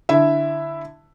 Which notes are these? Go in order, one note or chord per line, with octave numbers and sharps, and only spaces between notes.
D3 E4 E5